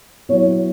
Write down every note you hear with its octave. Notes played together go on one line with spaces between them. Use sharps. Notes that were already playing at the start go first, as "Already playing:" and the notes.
F#3 B3 E4 C#5